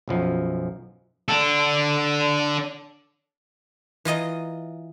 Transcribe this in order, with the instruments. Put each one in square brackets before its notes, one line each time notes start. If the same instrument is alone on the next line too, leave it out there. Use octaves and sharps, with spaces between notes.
[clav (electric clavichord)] B1 F#2 F3
[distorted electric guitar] D4 A4
[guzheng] E3 F4 D#5 A#5